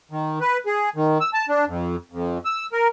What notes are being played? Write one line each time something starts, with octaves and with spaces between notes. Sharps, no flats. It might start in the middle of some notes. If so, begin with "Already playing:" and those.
D#3
B4
G#4
D#3
E6
A5
D4
F2
F2
E6
A#4